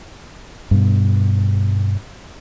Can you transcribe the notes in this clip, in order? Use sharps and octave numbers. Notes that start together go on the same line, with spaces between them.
G2 B2